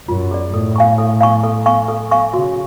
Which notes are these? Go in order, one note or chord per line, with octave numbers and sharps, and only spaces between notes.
F#2 F4
G#4 D5
A2 A4
F5 G#5 C#6
A4
F5 G#5 C#6
A4
F5 G#5 C#6
A4
F5 G#5 C#6
C#3 F#4